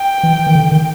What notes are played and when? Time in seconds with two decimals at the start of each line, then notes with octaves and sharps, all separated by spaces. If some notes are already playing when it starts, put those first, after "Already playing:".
Already playing: G5
0.23 E3
0.47 D#3
0.55 D3
0.72 D#3